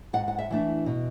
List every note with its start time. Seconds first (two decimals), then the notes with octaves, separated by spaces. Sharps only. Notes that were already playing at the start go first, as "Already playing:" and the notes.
0.13 G#2 F#5
0.28 F#5
0.39 E5
0.51 E3 A3 D4
0.86 B2